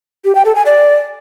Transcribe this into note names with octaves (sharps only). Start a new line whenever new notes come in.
G4
G5
A4
G#5
D5